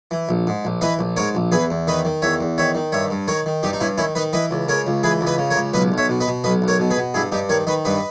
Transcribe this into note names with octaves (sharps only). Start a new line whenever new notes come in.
E3
A#1
G#2
A#1
E3 B4 D#5
A#1
G#2 A#4 C#5
A#1
E2 G#4 B4
E2
D#3 B4 D#5
D#3
E2 C#5 E5
E2
D#3 C#5 E5
D#3
G2 C#5 E5
G2
D#3 A#4 C#5
D#3
G2 D#4 G4
D#4
G2 C#4 E4
D#3 C#4 E4
D#3 B4 D#5
E3 B4 D#5
C#2
C#3 A#4 C#5
C#2
E3 G#4 B4
C#2
B4 D#5
C#3
A#4 C#5
C#2
B1 B4 D#5
B1
C#5 E5
B2
B4 D#5
B2
B1 B4 D#5
B1
A#4 C#5
B2
G#4 B4
B2
G2 E4 G#4
G2 D#4 G4
D#3 A#4 C#5
D#3 B4 D#5
G2 B4 D#5